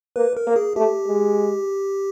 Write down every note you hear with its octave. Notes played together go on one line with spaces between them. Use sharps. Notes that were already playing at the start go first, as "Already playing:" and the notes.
A#3 B4
A#4
A#3
G#4
A3 G4
G#3